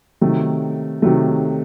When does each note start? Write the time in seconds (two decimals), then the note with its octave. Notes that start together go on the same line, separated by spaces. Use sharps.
0.21 C3 D#3 F#3 A3
1.02 C3 D#3 F#3 A3